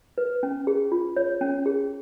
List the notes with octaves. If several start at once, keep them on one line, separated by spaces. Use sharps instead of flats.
B4
C#4
G#4
F4
C#5
C#4
G#4